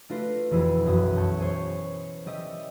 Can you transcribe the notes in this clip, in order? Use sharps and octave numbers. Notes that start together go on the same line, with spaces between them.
A3 D4 F4 B4 A#6 C7
E1 F2 E3 E4 G#4 E6
B1 F#2 D#6
A5 C#6 G6
G#4 C5 C#5 C#6
G3 G4 D#5 E5 D#7